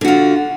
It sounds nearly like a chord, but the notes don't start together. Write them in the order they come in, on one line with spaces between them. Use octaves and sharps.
D3 F#4 F4